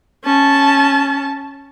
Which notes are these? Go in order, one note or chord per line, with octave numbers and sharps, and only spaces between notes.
C#4 A5